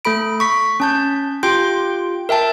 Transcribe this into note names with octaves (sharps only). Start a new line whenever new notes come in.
A3 A4 B5 D7
C#6 B6
C#4 A5 G6
F4 G4 G5 C6 G6 D7
A#4 E5 G5 A5